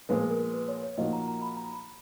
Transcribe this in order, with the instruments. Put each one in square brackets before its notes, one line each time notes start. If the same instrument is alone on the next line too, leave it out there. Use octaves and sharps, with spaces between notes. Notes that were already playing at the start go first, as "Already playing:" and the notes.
[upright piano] A#2 F3 G#3 B3
[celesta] A#4
B4
C#5
C#5
[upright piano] A#2 F3 A#3 D#4 F#4 [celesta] D#5
[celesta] A#5
A#5
B5
A#5
B5